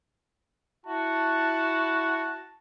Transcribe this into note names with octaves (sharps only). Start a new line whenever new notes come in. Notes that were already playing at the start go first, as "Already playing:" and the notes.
E4 F#4 A5